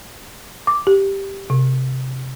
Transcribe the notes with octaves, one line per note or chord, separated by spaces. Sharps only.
D6
G4
C3